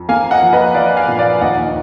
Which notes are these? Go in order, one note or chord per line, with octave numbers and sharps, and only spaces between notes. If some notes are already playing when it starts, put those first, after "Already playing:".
Already playing: F2
A#3 F5 G#5
D#5 F#5
F3
B4 D#5
F3 D5 F5
F5 G#5
A#2
D5 F5
D#2 D#5 F#5